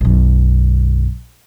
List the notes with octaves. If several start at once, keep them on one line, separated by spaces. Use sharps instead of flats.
B1 F#2